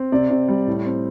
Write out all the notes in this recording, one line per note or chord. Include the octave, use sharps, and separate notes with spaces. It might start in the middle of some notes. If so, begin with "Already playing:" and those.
Already playing: C4
C3 D5
C3
G3
A2
C4